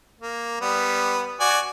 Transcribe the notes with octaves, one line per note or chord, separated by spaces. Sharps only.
A#3
G3 B3
F#4 D5 G#5